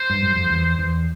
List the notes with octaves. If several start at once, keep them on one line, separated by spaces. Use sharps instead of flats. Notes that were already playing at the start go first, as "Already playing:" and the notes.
Already playing: C5
G2
F#2
F2
E2
E2